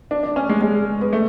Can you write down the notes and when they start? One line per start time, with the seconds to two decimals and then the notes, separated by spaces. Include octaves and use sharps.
0.11 D4
0.23 D4
0.36 C#4
0.49 G#3
0.61 G#3
1.01 B3
1.13 A3